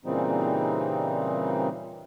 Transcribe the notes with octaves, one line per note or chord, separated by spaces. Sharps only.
A#2 C#3 E3 G3 C4 D#4